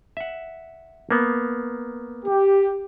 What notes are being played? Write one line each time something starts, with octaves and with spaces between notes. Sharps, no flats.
E5 F#5
A#3 B3
G4